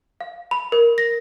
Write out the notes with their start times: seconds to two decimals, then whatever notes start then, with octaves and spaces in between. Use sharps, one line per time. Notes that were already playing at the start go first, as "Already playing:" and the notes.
0.21 F5
0.51 B5
0.72 A#4
0.98 A#6